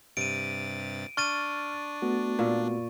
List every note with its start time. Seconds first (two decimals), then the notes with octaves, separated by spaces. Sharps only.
0.17 G2 C3 A6 D7 D#7
1.17 D4 C#6 F6 A6 D#7
2.02 A3 B3 F#4
2.39 A#2 F5